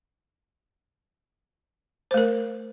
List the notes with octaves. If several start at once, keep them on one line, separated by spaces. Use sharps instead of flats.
A3 A#4 C5